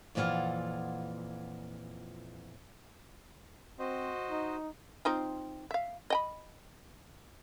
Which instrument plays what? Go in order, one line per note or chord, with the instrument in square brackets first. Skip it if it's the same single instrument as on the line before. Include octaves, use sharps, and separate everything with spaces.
[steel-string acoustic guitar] F2 A#2 E3 G#3 F4 F#5
[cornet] C4 [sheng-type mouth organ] F#4 C5 D#5
[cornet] D#4
[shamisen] C4 D#4 F4
E5 F5
D#5 G5 B5